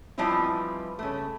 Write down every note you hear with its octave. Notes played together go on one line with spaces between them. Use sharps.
E3 F3 G3 C4 D#4 E4
C#3 A3